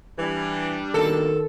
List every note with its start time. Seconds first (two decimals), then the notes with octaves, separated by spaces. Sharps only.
0.19 E3 G3 D4
0.94 B2 D#3 A#3 A4